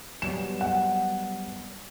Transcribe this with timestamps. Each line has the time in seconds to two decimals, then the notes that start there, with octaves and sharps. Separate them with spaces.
0.22 F#3 G3 B3 E7
0.61 F#5